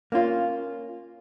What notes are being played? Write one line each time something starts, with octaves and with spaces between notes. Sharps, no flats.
A#3 C#4 F4